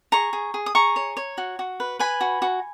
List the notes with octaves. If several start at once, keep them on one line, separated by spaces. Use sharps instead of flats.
G#4 A#5 C#6
G#4
G#4
D#6
G#4 A#5 C#6
C#5
C#5
F#4
F#4
B4
B4 G#5 B5
F#4
F#4